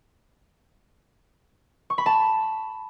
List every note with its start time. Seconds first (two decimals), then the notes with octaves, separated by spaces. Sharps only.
1.90 C#6
1.98 B5
2.06 A5